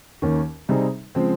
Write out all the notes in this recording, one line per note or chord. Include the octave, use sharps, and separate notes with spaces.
D#2 D#3 A#3 C#4
C3 G3 C4 D#4 G#4
C#3 F3 G#3 C4